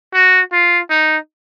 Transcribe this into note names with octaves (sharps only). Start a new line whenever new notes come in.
F#4
F4
D#4